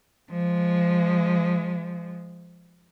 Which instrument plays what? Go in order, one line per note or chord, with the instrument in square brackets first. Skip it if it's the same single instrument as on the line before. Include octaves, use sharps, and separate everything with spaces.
[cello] F3 G#3